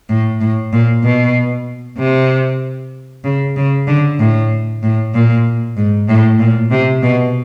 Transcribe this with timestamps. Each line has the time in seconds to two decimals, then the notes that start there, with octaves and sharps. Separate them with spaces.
0.09 A2
0.40 A2
0.73 A#2
1.04 B2
1.98 C3
3.24 C#3
3.56 C#3
3.88 D3
4.19 A2
4.83 A2
5.14 A#2
5.77 G#2
6.08 A2
6.40 A#2
6.71 C3
7.03 B2